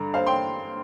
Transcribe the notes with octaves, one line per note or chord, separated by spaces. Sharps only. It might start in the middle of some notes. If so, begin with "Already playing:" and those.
Already playing: G2 D3 A#5
C5 F5
G5 C6